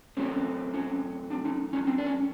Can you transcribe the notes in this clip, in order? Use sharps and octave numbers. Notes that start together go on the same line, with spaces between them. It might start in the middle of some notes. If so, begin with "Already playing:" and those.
F#2 D#3 F#3 A3 C4 C#4
C#4
C4 D4
C#4 D#4
C#4 D#4
C4 D4
D4
C#4